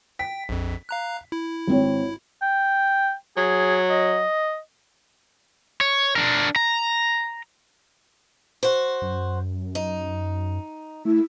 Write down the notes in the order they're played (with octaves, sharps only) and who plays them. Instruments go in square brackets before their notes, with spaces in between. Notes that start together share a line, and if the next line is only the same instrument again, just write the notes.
[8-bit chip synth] G5 [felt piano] B6
[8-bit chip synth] A#1 F2
F5 A#5 F#6
E4
[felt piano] G#1 C4 C#5
[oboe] G5
[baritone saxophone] F#3 [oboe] G#4
[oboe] D#5
[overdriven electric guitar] C#5
D4 A#4
A#5
[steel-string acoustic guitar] F#4 C5
[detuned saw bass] F#2
[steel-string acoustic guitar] D#4
[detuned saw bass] A3 [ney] E4